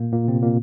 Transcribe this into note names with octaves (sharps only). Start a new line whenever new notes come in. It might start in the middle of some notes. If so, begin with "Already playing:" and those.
Already playing: A#2 A#3
A#2 A#3
C3 C4
A#2 A#3